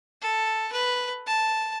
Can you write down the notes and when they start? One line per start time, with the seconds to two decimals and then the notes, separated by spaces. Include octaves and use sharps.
0.22 A4
0.73 B4
1.26 A5